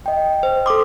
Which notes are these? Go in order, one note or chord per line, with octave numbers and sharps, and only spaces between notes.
D#5 G5
C5
A4 C6 D6 D#6